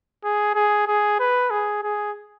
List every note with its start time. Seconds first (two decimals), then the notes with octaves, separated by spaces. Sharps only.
0.24 G#4
0.55 G#4
0.87 G#4
1.20 B4
1.50 G#4
1.83 G#4